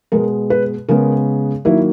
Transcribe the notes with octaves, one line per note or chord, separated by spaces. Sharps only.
B2 G#3 B3 A#4
B4
C#3 G#3 B3 A#4
D#3 F#3 A#3 E4